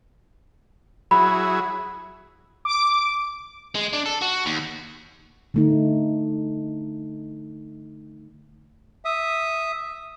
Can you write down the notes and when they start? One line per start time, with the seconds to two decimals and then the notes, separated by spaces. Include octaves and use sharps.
1.11 F#3 E4 G#4 B5
2.65 D6
3.75 G#3
3.93 D4
4.06 A4
4.22 F#4
4.46 D#2
5.54 D3 A3 D#4
9.05 E5 D#6